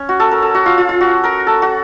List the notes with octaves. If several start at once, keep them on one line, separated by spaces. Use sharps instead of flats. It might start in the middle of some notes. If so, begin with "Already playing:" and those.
Already playing: C#4
F#4
A4
A#4
A4
F#4
F4
F4
F4
F#4
A#4
A4
F#4